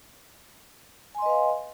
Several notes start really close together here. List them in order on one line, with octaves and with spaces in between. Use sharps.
G#5 C6 D#5 B4 F5